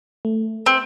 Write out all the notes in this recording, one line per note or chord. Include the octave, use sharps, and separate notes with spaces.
A3
C4